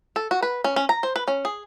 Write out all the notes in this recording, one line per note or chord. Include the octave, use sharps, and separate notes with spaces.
A4
F#4
B4
C#4
C#4
A#5
C5
B4
C#4
G#4